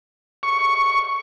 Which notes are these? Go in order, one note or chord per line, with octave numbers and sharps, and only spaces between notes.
C#6